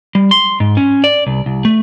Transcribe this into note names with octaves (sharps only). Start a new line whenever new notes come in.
G3
C6
G#2
C#4
D5
C2
C2
A3